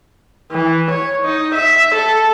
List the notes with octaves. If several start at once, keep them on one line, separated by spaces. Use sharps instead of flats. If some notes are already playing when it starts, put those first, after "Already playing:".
E3
C#5
D#4
E5
A4